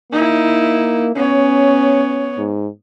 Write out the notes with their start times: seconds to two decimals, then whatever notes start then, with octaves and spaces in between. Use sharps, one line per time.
0.12 A#3 D#4 E4
1.16 B3 C#4 C#5
2.38 G#2